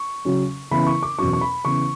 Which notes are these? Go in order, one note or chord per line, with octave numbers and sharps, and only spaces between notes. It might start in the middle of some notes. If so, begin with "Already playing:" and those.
Already playing: C#6
C#3 F#3 C#4
C#3 E3 B3 B5
C#6
D6
E2 B2 F#3 C#4 C#6
C#6
B5
C#3 E3 B3 C#6